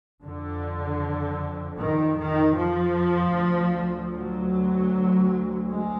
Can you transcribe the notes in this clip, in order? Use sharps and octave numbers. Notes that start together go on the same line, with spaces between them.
F2 D3
D#3
D#3
F3
D2
F#3
G#3